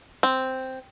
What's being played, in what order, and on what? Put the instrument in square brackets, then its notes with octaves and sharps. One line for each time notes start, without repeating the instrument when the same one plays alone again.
[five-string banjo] C4